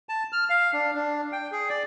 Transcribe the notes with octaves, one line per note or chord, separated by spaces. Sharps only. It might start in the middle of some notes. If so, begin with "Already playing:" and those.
A5
F6
F5
D4
D4
G5
G#4
D5